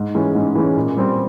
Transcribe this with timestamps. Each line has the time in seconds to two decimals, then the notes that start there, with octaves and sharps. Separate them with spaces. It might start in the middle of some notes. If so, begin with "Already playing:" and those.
Already playing: G#2
0.15 E3 G#3 C#4
0.35 G#2
0.55 E3 G#3 C#4
0.77 A#2
0.97 G3 C4